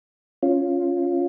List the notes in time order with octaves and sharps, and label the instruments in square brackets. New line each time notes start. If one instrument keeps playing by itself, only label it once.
[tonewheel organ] C#4 F4